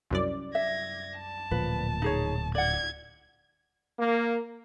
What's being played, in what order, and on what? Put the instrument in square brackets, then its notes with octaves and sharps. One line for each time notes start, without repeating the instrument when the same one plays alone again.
[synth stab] C2 F#2 D5
[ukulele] E5 [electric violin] G#6 A#6
[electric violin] A5
[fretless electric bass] D1 A#2 F3 [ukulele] B4
[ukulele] D#4 G#4 C#5
[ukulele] D5 F#5 [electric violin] G#6
[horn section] A#3